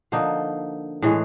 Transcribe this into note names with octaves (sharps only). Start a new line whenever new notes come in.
D3 F3 A#3 D#4
A2 E3 G#3